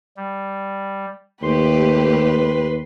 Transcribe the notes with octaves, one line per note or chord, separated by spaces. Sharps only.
G3
D#2 A3 G4 B4 C6